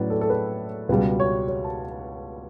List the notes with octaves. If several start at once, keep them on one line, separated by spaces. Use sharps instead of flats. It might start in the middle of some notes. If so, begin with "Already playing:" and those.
Already playing: A2 F#3 C#4 B4 D5
A4
A4
B4
C#2 B2 G3 B4
C#5
C#5
A5